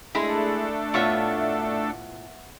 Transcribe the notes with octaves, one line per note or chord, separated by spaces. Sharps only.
G#3 A3 D4 E4 G#4 A4 B5
A2 B3 F4 C#5 E5 C#6